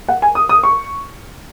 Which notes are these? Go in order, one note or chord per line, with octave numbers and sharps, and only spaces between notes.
F#5
G#5
D#6
D#6
C#6